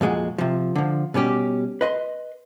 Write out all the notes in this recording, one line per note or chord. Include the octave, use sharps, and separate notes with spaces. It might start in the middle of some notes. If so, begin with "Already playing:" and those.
F2 A#2 G#3 F#4
C3 F3
D3 F3
B2 G3 C#4 G4
B4 D#5 C6